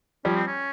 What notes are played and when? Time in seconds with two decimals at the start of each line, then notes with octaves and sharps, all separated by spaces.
0.25 F3 G3 C#4
0.36 C4
0.47 C#4